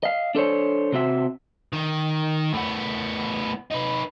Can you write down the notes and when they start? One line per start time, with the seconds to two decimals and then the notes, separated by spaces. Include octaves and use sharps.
0.03 D#5 F5
0.35 D4 A4 C5 C#5
0.92 C3 C4 F#4 E5
1.73 D#3
2.54 A2 B3
3.72 D#4 B4